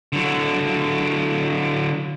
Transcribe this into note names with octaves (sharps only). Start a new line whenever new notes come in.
D3 F#3